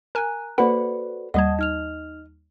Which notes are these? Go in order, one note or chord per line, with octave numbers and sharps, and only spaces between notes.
A#4 G#5 A#5 F#6
A#3 F#4 A4 B4 C5 D5 F#5
D#2 G3 D#5 F#5 A5 D#6 G#6
D#4 F6 F7